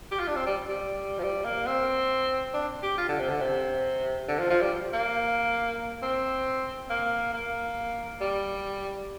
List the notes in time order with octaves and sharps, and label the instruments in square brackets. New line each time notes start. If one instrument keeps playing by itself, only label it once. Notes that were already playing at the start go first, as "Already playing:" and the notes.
[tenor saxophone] G4
F4
D4
C4
G3
G3
F3
G3
A#3
C4
D4
G4
F4
D3
C3
D3
C3
D3
F3
F3
G3
A#3
C4
A#3
A#3
G3